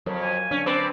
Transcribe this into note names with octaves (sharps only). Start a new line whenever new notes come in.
F2 F#3 A#4 C#5
G#5
C#4 D4
C4 B4 D5